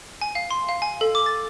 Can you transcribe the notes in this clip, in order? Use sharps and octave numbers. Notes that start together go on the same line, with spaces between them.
G#5
F5
C6
F5
G#5
A4
D6
A6